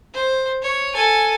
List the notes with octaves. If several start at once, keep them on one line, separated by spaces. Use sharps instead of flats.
C5
C#5
A4 G#5